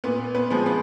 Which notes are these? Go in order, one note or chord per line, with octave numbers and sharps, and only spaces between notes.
A#2 B3 B4
B3 B4
F3 G#3 B3
B3 B4